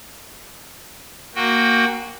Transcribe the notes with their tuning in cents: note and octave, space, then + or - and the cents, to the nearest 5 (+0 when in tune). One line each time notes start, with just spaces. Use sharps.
A#3 +0 F#4 +0 G5 +25